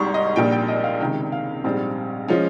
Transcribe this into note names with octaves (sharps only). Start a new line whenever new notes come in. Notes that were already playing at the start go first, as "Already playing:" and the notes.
Already playing: G#1 G#2 G3 C6 C#6
D#5
A#1 A#2 G3 G5
G5
D#5
F5
C#2 C3 D#3 G5
F5
A#1 G#2 G3 C4
F3 G#3 C#4